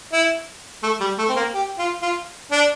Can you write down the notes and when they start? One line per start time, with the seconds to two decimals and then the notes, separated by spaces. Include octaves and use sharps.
0.12 E4
0.83 A3
1.00 G3
1.18 A3
1.29 C4
1.36 A#3
1.54 G4
1.78 F4
2.02 F4
2.51 D4